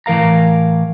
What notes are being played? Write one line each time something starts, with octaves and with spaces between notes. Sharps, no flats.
A2 E3 A#4 F5 A#5